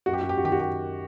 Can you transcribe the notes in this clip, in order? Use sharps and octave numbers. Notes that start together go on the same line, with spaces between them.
F#2 F#4
G4
F#4
G4
F#4
D#3 G4
F#4
G4